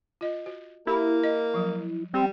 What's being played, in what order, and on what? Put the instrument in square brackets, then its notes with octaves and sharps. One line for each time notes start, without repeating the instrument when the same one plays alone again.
[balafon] F4 D#5
F#4
[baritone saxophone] A#3 [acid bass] E4 [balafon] G4
[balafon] D#5
F3 F#3
[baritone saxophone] G3 [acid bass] C4